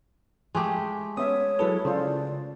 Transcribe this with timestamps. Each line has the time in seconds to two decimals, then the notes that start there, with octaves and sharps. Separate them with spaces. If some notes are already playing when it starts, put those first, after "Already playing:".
0.55 G#3 A3 G4
1.17 B3 C#4 C#5 E5 D#6
1.59 F#3 E4 G#4 A4 B4
1.85 C#3 F4 A4 C5 D5